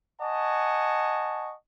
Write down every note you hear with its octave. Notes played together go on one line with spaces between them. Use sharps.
D#5 F#5 G#5 A5 C#6